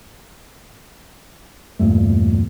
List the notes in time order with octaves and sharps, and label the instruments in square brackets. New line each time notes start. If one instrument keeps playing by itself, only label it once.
[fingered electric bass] E2 G2 A#2 A3